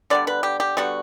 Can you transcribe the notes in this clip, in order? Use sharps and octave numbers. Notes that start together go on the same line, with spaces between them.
D3 G3 B3 D5
B4
G4
G4
D3 G3 B3 F#4